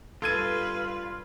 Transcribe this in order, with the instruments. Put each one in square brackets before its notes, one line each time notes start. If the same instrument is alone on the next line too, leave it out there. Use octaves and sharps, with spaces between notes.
[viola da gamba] G2 B4 [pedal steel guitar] F4 [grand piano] A4 G#6 D#7